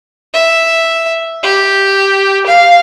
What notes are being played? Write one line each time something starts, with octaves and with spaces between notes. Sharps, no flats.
E5
G4
F5